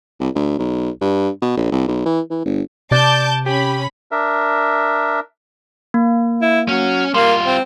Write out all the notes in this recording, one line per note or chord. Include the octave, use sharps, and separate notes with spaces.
C2
D2
B1
G2
B2
A#1
C2
B1
E3
E3
G1
C3 D5 A5 D6 G6
C#4 G4 B5
D4 A#4 E5
A#3
E4
F#3 C#4
G3 A#3 F4 C6
C4